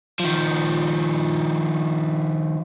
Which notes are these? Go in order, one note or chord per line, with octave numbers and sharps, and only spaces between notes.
D#3 F3